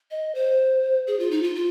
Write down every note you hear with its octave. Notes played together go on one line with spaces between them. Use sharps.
D#5
C5
G#4
F4
D#4
F4
F4